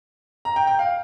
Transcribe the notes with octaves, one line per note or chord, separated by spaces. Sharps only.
A#5
G5
G5
F5